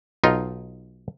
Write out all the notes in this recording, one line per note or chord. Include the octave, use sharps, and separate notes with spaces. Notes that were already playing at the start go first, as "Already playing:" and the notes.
B1 D#4 F4